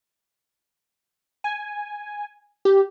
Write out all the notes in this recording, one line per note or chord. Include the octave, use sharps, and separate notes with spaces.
G#5
G4